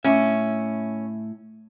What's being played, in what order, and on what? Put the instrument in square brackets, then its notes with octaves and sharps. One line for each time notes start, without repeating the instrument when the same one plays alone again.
[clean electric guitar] A2 E5 [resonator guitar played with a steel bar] C#4